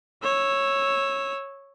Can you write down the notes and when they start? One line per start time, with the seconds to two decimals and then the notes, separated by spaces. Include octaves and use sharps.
0.23 C#5 E6